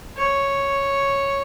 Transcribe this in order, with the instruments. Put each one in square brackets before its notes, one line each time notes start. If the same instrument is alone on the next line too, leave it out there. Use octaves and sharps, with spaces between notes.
[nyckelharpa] C#5